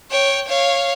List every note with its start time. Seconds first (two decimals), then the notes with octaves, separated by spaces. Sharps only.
0.11 C#5 G5
0.48 C#5 F5